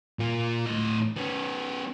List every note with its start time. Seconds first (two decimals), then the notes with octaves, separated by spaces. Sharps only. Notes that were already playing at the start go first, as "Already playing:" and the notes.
0.19 A#2 F4
0.66 A2 D#5
1.17 B3 C#4